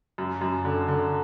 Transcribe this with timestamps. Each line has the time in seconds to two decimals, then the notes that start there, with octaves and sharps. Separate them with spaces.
0.18 F#2
0.41 F#2
0.65 D3
0.88 D3